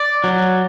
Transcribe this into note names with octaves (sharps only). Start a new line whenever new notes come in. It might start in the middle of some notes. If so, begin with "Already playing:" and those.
Already playing: D5
F#3